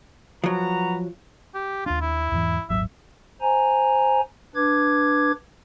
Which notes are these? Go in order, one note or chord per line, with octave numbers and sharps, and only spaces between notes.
F3 F#3 F#4 B4 A#5
G4
D#2 D4 F4
E4
E2 G#2 E3
D#1 G#1 F#3 E5
C5 G#5 A#5
D4 B4 D6 G#6